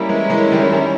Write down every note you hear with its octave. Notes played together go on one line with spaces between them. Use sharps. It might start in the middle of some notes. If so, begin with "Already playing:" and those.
Already playing: G3 A#3 C#4 E4 A#4
E3 G#3
E3 G#3
D#3 G3
D#3 G3